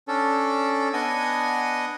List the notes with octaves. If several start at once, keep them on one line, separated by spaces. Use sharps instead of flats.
C#4 D4 A4
B3 D4 D#5 F#5 G#5 D#6